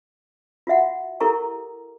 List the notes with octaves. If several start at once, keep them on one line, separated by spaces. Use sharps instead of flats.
F4 F#4 E5 F#5
E4 G4 A4 A#4 A#5 C#6